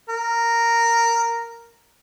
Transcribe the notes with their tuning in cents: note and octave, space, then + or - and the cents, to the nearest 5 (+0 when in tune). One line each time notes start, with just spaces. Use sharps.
A#4 -5